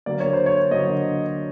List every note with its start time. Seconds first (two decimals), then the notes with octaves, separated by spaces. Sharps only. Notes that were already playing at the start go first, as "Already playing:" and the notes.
0.06 D3 F#3 A#3 D5
0.20 C#5
0.33 C5
0.46 C#5
0.70 D3 F#3 A#3 D#5